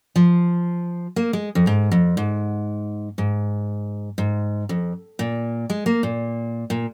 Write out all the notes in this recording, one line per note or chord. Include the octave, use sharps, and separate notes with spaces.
F3
A#3
G#3
F2
G#2
F2
G#2
G#2
G#2
F2
A#2
G#3
A#3
A#2
A#2